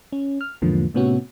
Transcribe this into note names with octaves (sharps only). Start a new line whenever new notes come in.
C#4
F6
E2 G#2 D3 F3 A#3
A2 C3 B3 C#4 F#4